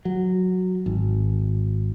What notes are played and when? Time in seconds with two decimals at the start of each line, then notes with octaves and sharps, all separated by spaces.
0.05 F#3
0.86 G#1